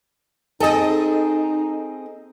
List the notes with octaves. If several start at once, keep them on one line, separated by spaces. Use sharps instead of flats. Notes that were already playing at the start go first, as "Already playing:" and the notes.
C4 D#4 G#4 A4 D#5